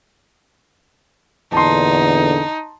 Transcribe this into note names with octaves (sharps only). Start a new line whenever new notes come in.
E2 A#2 D3 D#4 A5 C6